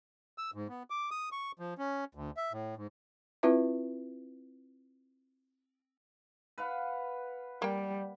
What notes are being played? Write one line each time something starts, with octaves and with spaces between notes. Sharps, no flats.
E6
G#2
B3
D6
D#6
C#6
F3
C#4
D2
E5
A2
G#2
C4 E4 F4 B4 E5
B4 F5 F#5
G3 A#3 G5